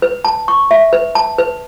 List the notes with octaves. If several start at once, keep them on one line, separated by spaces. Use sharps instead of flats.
B4
A5
C#6
E5
B4
A5
B4